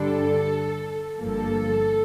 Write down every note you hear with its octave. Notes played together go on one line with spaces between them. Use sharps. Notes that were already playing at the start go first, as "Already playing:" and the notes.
Already playing: G2 D3 G3 D4 A4
G1 G2 F3 A#3 A4